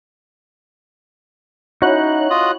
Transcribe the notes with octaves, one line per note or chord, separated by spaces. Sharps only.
C#4 D#4 E4 F#4 C#5 F#6
F4 D#5